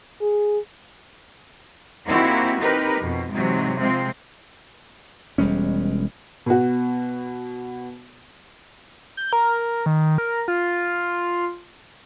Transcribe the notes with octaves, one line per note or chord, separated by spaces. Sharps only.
G#4
A#3 C4 D#4 E4 F#4 G4
C4 D#4 G4 A#4 B4
F2 B2
G#2 C3 E3 F#3
C3 F3 G#3 C4
E1 G3 G#3 C#4
B2 B3 F#4
G6
A#4
D#3
A#4
F4